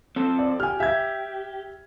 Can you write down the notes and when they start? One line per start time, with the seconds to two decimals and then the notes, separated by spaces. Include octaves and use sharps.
0.16 C4 A4 C5
0.39 D5
0.60 G4 G#5 F6
0.80 G4 E5 G#6